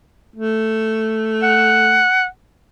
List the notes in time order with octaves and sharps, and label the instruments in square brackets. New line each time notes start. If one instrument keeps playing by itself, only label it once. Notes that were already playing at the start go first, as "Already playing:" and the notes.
[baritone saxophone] A3
[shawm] F#5